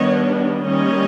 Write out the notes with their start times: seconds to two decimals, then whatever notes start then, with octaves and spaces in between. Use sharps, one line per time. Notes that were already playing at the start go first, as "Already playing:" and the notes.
Already playing: D#3 G3 B3 D4 C#5 D#5
0.64 D#3 G3 A#3 C#4 C#5 D#5